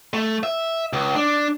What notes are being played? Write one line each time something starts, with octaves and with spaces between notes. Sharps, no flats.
A3
E5
C#2
D4